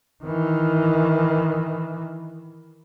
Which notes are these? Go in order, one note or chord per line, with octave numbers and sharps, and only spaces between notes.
D#3 E3